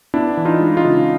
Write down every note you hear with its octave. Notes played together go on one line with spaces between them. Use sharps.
B3 D4 E4
E3
D#4 F4
G#3
D#4 F4
C#3